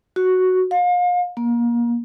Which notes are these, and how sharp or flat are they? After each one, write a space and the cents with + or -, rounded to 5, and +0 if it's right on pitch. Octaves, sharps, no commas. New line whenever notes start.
F#4 +0
F5 +35
A#3 +25